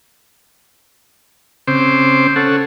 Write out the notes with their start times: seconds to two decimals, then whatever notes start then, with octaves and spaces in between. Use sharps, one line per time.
1.68 C#3 C4 C5 D6
2.36 C#4 A4 F#5